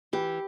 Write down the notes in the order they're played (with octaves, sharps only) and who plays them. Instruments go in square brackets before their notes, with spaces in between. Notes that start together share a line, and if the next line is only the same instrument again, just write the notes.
[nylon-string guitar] E3 G4